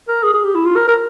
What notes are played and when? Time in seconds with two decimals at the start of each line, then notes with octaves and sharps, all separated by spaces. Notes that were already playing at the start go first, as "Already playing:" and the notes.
0.08 A#4
0.23 G#4
0.34 G#4
0.44 G4
0.55 E4
0.65 F4
0.76 A#4
0.88 A#4